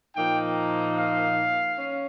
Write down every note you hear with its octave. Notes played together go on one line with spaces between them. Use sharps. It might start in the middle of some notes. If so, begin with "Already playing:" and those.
A#2 F3 A#3 D#4 G5
F5
C#4